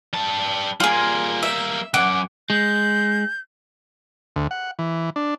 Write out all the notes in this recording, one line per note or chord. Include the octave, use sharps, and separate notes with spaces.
G3 A5
G3 A#3 F4 G#4
E5
C2 F#2 F#5 D6
G#3 G6
D2
F#5
E3
D4